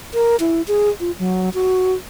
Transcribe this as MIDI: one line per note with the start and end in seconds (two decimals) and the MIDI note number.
0.14 0.36 70
0.40 0.62 64
0.68 0.90 68
1.00 1.12 65
1.19 1.49 54
1.54 1.94 66